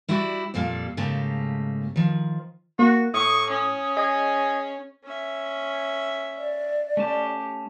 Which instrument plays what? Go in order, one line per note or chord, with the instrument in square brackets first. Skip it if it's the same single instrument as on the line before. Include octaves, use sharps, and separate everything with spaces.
[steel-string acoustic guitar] G3 E4 F#4 G4 D5
F2 A#2 G3 A4 F5
G#2 C#3 A3 A#3 G4 A5
D#3 F3
[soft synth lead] A#3 [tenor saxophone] F#4
[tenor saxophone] A2 [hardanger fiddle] C#6 [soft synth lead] D#6
[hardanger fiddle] C#4
[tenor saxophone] G#4 [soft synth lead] D#5
[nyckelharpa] C#4 E5
[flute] D5
[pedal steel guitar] A3 C#4 A5 [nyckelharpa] G4